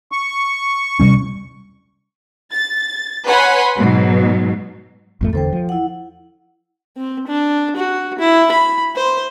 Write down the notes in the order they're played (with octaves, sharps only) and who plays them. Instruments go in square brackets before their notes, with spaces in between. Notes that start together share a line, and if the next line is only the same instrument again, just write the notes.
[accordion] C#6
[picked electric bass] C3 G3 C#4
[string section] A6
B4 C#5 F#5 G#5 B5 C6
G#2 B2 F#3
[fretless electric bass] G#1 F2 A3
[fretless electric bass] E2 D3 [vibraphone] A4 C5 G5
[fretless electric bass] F3
[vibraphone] E4 F#5
[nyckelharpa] C4
D4
F#4
E4
B5
C5